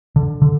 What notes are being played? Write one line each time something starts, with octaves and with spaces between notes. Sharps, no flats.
D3
D3